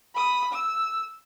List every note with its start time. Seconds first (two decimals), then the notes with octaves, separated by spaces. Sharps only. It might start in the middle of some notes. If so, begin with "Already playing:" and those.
0.14 B5 D#6
0.52 E6